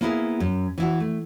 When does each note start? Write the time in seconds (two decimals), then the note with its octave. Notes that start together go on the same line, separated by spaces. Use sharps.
0.01 A#3 B3 E4 F#4 G#4 A#4
0.40 F#2
0.78 E3 E4 F#4
1.00 A3